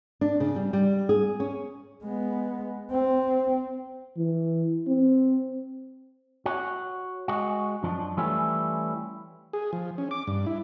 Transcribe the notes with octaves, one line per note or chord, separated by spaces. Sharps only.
D4
C#3
G3
G3
G#4
C#4
G#3 B3
C4
E3
C4
F#4 C#5
G#3 F#4
F#2 F3 D4
E3 G3 A3 C#4 E4 F4
G#4
F3
C#4
D6
G2
E4